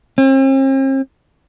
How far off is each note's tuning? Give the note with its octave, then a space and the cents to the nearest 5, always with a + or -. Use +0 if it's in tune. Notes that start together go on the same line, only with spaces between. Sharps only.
C4 +45